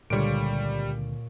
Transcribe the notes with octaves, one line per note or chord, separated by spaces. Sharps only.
C#2 A#2 D3 G3 C#5 D7